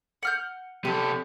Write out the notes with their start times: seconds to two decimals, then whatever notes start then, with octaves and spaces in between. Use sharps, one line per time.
0.23 F#5 F6 G6
0.85 C3 G4 A4